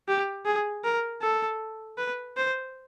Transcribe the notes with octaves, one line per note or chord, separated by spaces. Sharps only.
G4
G#4
A#4
A4
B4
C5